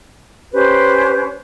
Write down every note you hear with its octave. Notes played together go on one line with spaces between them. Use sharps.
C#4 G4 B4 C5